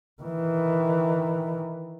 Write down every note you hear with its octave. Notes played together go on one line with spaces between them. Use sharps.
D#3 E3